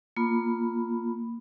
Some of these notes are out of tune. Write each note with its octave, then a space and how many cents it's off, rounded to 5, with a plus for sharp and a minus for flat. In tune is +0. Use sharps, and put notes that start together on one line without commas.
A#3 -5 F4 +0 B5 +0